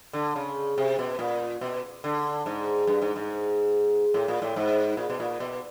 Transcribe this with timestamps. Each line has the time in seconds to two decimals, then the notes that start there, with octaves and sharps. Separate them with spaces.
0.13 D3
0.36 C#3
0.78 C3
0.99 B2
1.19 A#2
1.61 B2
2.04 D3
2.46 G#2
2.87 G2
3.02 G#2
3.16 G#2
4.14 A2
4.28 A#2
4.42 A2
4.56 G#2
4.97 A#2
5.10 B2
5.20 A#2
5.40 B2